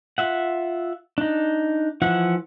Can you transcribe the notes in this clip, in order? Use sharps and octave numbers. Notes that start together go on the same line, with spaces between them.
F4 E5 F#5
D4 D#4
E3 F3 E4 F#5